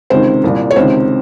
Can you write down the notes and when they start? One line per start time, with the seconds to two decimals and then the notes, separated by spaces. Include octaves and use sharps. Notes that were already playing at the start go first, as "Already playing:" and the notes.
0.10 C#2 C3 D#3 C5
0.44 C2 A#2
0.71 C#5
0.76 C#2 C3 D#3 C5